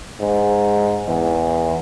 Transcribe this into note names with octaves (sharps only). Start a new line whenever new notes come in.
G#2
E2